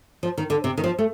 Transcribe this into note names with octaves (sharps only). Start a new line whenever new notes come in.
F3
D#3
D3
C3
D#3
F3
A3